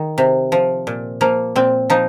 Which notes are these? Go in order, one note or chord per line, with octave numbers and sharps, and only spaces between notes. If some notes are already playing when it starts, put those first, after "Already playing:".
Already playing: D#3
C3
F3
A#2
F3 A#3
A#2 C4
F3 D#4